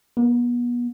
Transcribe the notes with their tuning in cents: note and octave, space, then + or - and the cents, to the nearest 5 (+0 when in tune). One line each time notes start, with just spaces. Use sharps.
B3 -35